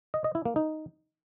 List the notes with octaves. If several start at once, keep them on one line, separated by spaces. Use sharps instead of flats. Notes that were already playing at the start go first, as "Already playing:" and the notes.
D#5
D#5
E4
A#3
D#4